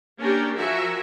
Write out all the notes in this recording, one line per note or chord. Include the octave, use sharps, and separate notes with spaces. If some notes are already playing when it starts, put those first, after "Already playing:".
A#3 C#4 D4 G4 A#4
F3 F#4 A#4 E5 G#5